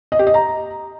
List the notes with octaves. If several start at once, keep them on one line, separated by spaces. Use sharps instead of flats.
D#5
G4
D#5
A#5